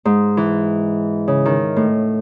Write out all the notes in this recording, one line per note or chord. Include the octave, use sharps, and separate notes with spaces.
G#2
E3
C#3
D#3
A2